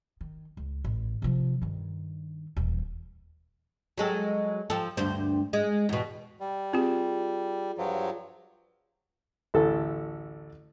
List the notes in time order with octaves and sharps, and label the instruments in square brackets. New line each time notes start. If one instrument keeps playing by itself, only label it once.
[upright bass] D#3
C#2
A1
C3 F3
G2 D#3
D#1 E3
[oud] F#3 G#3 A4
F3 A4
D2 G2 C5
G#3
E2 B2
[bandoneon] G3
[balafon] C4 G4 [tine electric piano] F4 G#4
[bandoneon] G2 F3 F#3
[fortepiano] A1 D2 A4